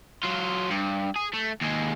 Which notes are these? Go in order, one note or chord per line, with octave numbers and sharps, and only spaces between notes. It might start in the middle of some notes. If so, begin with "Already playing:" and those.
F#3 F4
G2
G#4
A3
D#2 G#3